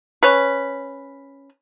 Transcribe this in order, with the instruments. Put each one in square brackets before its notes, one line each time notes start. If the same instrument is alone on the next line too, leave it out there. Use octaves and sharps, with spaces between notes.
[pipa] C#4 B4